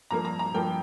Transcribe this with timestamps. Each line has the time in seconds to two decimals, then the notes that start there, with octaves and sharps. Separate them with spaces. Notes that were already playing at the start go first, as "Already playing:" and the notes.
0.11 G2 F3 A#3 A#5
0.25 A#5
0.39 A#5
0.54 G2 F3 A#3 G5